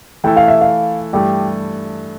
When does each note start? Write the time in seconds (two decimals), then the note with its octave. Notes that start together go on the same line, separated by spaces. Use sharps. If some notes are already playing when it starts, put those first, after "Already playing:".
0.24 E3 A3 E4 A4 G5
0.36 F5
0.48 E5
0.61 F5
1.13 G2 E3 A3 G4